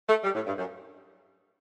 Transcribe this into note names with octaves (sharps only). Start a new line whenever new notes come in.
A3
G3
A2
G2
F#2